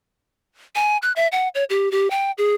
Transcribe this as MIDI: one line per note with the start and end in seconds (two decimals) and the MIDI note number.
0.75 0.97 80
1.02 1.12 90
1.16 1.27 76
1.32 1.48 78
1.55 1.64 73
1.70 1.91 67
1.92 2.10 67
2.11 2.31 79
2.38 2.55 68